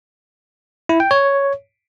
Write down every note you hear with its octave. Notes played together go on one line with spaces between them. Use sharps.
E4
G5
C#5